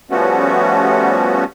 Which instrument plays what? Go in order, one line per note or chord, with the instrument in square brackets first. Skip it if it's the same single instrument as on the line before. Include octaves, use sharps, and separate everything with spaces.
[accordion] F3 G3 A3 B3 C#4 F#4